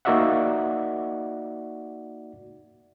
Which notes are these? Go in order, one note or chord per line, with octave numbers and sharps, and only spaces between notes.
A#3 D#4 F#4 D5 E5 F#5